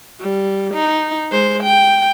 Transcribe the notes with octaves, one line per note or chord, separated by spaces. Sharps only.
G3
D#4
G#3 C5
G5